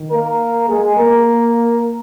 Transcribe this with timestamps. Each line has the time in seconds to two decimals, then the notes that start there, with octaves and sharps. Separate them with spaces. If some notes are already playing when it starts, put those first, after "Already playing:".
Already playing: D#3
0.11 A#3 A#4
0.69 G#3 G#4
0.97 A#3 A#4